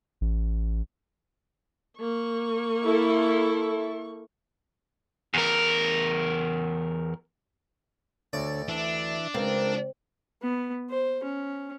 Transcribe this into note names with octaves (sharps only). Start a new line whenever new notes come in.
A1
A#3 C#6
E4 A4
E2 A#4
D2 D3 A4 C#5 D5
E3 D4 E5
C#2 C4 A#4
B3
C5
C#4